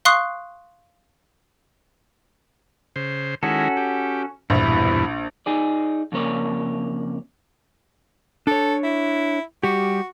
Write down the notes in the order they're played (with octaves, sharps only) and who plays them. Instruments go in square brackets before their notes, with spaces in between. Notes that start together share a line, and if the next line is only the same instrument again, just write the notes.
[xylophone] F5 C6 C#6 D#6 F#6 C7
[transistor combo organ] C#3 C5
[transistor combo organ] D#3 G#3 E4 [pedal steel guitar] C#4 F#4 A4
[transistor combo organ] G4
[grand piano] A#1 [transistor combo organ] E2 G2 B2 [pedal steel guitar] E4
[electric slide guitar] D#4 G#4 D5
F2 C#3 A#3 C#5 D5
[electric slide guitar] D4 C#5 [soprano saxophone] A4
[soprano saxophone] E4
[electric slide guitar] G3 G4 [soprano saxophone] F#4